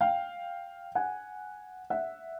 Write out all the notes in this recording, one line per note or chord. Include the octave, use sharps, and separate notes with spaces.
F5 G5
F#5 G#5
E5 F#5